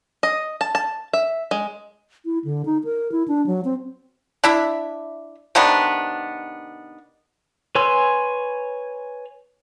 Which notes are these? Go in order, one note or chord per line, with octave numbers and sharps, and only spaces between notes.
D#5
A5
A5
E5
G#3
E4
D3
D#4
A#4
E4
D4
F#3
C4
D4 E4 E5
C3 D#3 B3 D4
B4 C#5 G#5 C6 E6